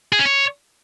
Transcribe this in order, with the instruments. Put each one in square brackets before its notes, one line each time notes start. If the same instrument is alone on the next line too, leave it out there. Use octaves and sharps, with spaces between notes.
[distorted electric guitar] G#4
C#4
C#5